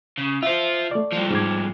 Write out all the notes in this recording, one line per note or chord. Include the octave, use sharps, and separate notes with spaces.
C#3
F4 C5 E5
A3 D5
G2 F3
G#2 D6 G#6